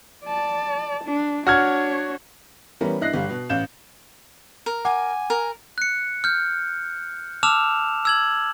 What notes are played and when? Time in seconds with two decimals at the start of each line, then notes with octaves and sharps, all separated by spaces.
0.25 D5 A5
1.04 D4
1.47 D4 F#4 C#5 F6 G#6
2.81 E3 G3 B3 C#4 A#4
3.01 G2 E4 D#5 F#6 A#6 C7
3.13 G1 G3 F5
3.29 B2
3.49 A1 F5 G6 E7
4.66 A#4
4.85 F#5 G#5 D6
5.30 A#4
5.78 F#6 C#7
6.24 F6 G6
7.43 A5 D6 E6 F6 E7 F7
8.05 E6 G#6 F#7